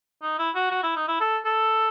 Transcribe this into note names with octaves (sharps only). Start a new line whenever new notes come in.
D#4
E4
F#4
F#4
E4
D#4
E4
A4
A4